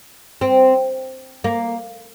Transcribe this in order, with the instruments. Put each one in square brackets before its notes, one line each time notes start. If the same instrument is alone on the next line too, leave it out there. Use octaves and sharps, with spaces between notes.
[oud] C4
A#3